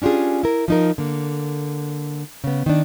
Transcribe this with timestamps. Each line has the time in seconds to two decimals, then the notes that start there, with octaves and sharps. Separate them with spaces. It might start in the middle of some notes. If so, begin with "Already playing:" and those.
0.02 C#4 D4 F4 G4 G#4
0.43 E4 A#4
0.68 F3 D#4 A#4
0.98 D3 A#3
2.44 C#3 B3
2.66 D#3 D4